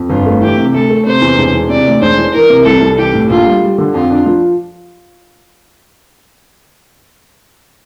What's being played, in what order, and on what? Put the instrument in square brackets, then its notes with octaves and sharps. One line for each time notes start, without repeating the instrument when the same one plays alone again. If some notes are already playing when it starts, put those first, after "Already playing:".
Already playing: [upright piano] F2
[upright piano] G1 [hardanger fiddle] F4
[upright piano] A3
[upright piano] E3 [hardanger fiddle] G4
[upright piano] C3
[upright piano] D2 [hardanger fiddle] A4
[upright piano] A3
[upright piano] C3 [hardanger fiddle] C5
[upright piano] E2
E1
E3
[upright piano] C3 [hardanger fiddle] D5
[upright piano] D2
[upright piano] E1 [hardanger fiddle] C5
[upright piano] E3
[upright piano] E3 [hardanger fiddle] A#4
[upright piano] C3
[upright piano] C2 [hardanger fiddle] A4
[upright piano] C2
[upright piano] E3 [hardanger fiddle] G4
[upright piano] A2
[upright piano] A#1 [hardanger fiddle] F4
[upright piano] G3
G3
D3
[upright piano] F2 [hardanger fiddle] F4
[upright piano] D4
F3